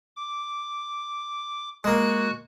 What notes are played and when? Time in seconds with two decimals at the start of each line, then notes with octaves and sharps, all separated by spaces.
0.16 D6
1.84 G#3 A#3 F#4 F#6